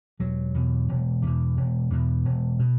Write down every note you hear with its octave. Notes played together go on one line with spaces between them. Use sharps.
E1 F#3
E2 B2
E1
E2 B2
E1
E2 B2
E1
B2